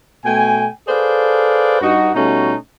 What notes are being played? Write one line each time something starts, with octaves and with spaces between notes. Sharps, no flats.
B2 A3 G5 G#5
G#4 A4 B4 C5 D5 F5
G2 D#4 F#4
B2 G3 A3 C#4 D#4 F#4